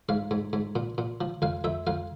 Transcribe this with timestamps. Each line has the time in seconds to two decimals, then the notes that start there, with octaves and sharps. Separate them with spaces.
0.09 G#2 F5
0.31 G#2
0.53 G#2
0.76 A#2
0.98 A#2
1.21 F3
1.42 F2 F5
1.64 F2 E5
1.87 F2 F5